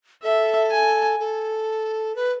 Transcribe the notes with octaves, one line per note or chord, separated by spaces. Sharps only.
A4 E5
G#5
A4
B4